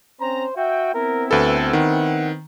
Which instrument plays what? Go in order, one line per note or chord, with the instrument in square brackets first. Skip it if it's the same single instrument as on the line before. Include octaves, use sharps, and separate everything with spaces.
[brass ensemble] C4 C#4 A#5 [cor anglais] C5
[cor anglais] F#4 [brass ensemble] E5 G5
[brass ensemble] B3 C4 E4 [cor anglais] A#4
[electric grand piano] D2 A4 [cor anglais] B4
[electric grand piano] D#3 [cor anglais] F#5